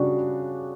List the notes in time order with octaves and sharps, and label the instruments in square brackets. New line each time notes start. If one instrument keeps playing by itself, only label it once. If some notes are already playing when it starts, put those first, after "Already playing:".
Already playing: [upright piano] C#3 G3 D4 F#4